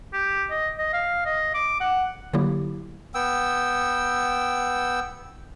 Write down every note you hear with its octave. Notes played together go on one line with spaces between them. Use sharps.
G4
D#5
D#5
F5
D#5
D6
F#5
D3 F#3 G3 A#3 E4 G4
B3 G5 E6